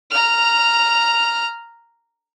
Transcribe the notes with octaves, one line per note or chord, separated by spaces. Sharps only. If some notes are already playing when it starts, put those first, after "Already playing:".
A#5 F6